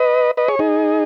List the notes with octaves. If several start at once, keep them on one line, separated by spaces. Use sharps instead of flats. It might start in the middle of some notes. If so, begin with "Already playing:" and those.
Already playing: B4 D#5
B4 D#5
G#4 C#5
D#4 G#4